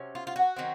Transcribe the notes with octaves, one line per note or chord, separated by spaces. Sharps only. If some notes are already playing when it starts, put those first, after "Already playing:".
Already playing: C3 F#3 C#4
F4
F4
F#4
D#3 F#3 C4